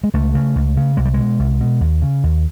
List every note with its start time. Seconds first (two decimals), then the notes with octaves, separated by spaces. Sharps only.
0.04 G#3
0.14 C#2 A3
0.35 C#3
0.56 C#2
0.77 C#3
0.97 C2 G#3
1.05 G3
1.14 B2 G#3
1.39 C2
1.60 B2
1.81 D#2
2.02 C#3
2.23 D#2